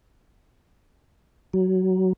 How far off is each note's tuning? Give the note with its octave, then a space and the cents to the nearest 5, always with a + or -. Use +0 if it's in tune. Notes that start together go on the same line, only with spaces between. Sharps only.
F#3 +15